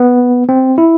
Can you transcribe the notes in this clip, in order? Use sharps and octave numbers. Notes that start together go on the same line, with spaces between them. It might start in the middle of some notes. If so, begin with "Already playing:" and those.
Already playing: B3
C4
E4